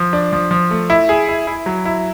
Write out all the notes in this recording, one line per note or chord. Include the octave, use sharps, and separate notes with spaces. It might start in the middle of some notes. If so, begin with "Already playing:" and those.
Already playing: F3
D4
F3
F3
A3
E4
G#4
E4
E4
F#3
E4